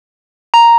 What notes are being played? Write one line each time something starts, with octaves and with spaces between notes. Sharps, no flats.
A#5